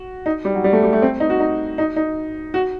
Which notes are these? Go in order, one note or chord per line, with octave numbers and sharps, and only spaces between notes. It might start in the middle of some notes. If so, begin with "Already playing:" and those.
Already playing: F#4
D#4
G3
F#3
G3
A3
G3
A3
C4
D#4
F#4
D#4
D#4
D#4
F#4